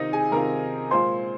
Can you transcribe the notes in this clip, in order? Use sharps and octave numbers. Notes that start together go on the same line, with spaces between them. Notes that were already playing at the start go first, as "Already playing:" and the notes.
Already playing: C3 D#3 C4 D#4 F4 D#5
G#4 G#5
C3 D#3 C4 F4 A#4 A#5
A#2 G#3 F4 C5 C6